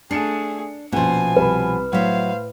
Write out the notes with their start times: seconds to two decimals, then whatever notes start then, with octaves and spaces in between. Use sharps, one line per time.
0.11 A3 D4 G#4 C7 C#7 E7
0.92 A#1 B2 F3 C#4 G#5
1.37 C2 B4 B5
1.93 A2 F#3 C5 E5 F5